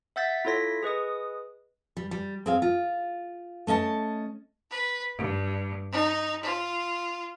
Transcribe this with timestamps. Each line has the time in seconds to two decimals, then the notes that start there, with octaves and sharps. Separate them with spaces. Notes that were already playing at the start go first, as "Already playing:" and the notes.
0.16 E5 F#5 E6 G6 A6 B6
0.45 E4 F4 A4 C#5 A#6 B6
0.83 G#4 B4 D#5 D#6
1.97 G3
2.11 G3
2.46 C4 G#4 F5
2.62 F4
3.67 A3 C#4 D#5 A5
4.70 B4
5.16 G2
5.93 D#4
6.43 F4